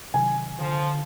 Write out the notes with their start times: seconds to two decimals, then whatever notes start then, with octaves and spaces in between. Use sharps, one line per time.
0.14 C3 D#3 F#3 G#5
0.59 D3 F3